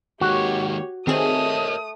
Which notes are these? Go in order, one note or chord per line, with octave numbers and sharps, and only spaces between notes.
D#3 G#3 A#3 F#4 G4 C#5
D#3 A3 C4 G#4 A#4 C#5 D#5 D#6